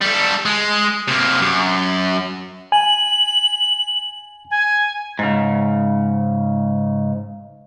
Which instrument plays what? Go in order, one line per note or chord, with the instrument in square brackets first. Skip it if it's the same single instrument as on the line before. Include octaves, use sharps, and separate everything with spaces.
[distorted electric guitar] G3 A4
G#3
C3 A#3
F#2
[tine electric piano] G#5 [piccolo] F#7
[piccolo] G#5
[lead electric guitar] G#2 C#3